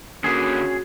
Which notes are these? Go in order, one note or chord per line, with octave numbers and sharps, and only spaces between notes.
D3 A#3 C#4 F#4 G#4